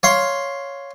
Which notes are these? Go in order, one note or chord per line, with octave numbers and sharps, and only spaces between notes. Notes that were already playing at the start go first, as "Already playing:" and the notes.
C#5 F5 C6